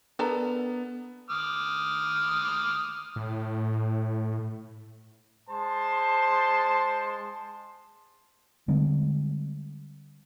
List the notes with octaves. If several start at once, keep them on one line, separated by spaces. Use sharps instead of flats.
B3 D4 A4 A#4
D6 D#6 F6
A2
G#3 C5 A5 C6
D3 G3 G#3 C4